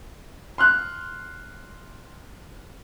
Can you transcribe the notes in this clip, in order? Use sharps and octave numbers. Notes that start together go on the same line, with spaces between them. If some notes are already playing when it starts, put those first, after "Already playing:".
C6 F6 F#6